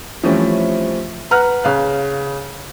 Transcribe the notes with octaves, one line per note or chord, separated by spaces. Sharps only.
E3 F3 G3 A3 C4 C#4
B4 F#5 A#5 F6 F#6
C#3 F5 F#6